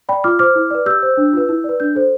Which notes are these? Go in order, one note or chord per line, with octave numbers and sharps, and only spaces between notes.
D5 G5 B5
F4 D6 F6
C5 D6 F6
E4
B4 D5
G4 E6 G6
C5
D4
F4 B4
E4
B4 D5
D4 G6
A4 C5